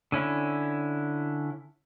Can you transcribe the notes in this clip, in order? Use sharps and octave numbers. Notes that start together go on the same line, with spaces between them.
D3 C#4 E4